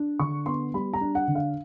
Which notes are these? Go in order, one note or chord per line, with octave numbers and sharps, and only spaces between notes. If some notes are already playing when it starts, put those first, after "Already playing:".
Already playing: D4
D3 C#6
B3 C6
G3 B5
A#5
D4
F#5
D3
F5